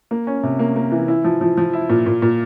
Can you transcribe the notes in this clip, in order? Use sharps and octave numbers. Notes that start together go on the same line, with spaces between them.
A#3
C#4
C3
A#3
A#3
E3
E4
F3
F3
F3
E4
A#2
A#2
A#2